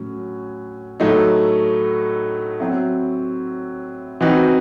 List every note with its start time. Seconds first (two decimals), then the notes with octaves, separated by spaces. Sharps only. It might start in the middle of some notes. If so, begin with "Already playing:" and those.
Already playing: A2 F#3 C#4
1.00 A2 F#3 A3 D#4
2.60 F#3 C4 E4
4.21 E3 C4 D#4 F#4